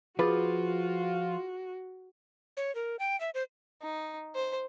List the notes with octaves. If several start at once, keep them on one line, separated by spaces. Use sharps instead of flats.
F3 F4 F#4 G#4 B4 D6 A6
C#5
A#4
G5
E5
C5
D#4
C5